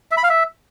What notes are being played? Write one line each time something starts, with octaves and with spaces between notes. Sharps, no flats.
E5
B5
F5
E5